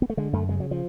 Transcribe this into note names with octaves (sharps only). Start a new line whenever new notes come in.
B3
A3
D3 G#3
F#2 A3
C#3 G#3
F#3
F3